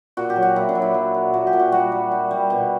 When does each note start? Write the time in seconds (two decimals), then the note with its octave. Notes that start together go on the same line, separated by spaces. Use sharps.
0.17 A#2 F#4
0.30 G4
0.36 F#3
0.42 F#4
0.56 A#2 E4
0.69 D4
0.75 F#3
0.82 E4
0.94 F#3
1.14 A#2
1.34 A#2 F#4
1.47 G4
1.53 A#2
1.59 F#4
1.72 G3 F#4
1.92 G3
2.12 G3
2.31 G3
2.50 B2